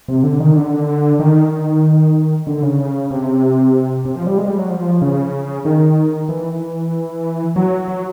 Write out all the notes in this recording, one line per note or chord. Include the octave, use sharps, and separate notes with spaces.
C3
D3
D#3
D3
D#3
D3
C#3
C3
C3
F3
G3
G#3
G3
F#3
F3
C#3
D#3
E3
F#3
F#3